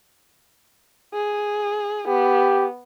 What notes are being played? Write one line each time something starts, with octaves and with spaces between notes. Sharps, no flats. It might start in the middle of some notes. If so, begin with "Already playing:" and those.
G#4
B3 G4